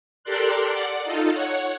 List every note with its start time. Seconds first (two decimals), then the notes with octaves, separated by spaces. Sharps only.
0.24 G4 A4 A#4 D5 C6 F#6
0.71 D5 F#5
1.04 D#4 F4 A4
1.33 C#5 F#5